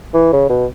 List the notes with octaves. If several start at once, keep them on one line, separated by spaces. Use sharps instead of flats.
E3
C#3
B2